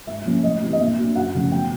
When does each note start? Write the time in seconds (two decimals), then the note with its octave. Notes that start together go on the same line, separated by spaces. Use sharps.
0.07 G#2 E5
0.25 F3 A#3 C#4
0.43 A2 D#5
0.61 E3 G3 C4
0.73 D#5
0.79 A#2 E5
0.97 F#3 A#3 D4
1.15 F#2 F#5
1.34 C#3 F3 A3 C#4
1.52 B2 G5